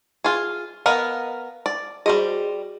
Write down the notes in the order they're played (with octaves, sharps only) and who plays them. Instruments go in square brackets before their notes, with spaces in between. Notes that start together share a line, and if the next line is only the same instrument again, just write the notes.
[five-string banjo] F4 G#4
[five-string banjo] B3 A#4 D#5 [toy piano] F5
[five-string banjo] D5
[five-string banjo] G3 C5 D#5 [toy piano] F#4 G#4